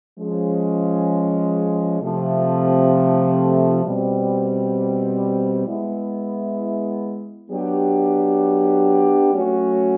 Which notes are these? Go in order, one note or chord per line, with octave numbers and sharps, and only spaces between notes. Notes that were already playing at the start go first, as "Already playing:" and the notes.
F3 G#3 C#4
C3 F3 A3
B2 G3 C4
G#3 B3 E4
F#3 B3 D4 G4
F#3 A3 C#4 F#4